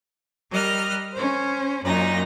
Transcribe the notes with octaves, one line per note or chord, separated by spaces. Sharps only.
G3 A#4 D#5 F6 F#6
C#4 C5
F#2 A#2 D#4 A#6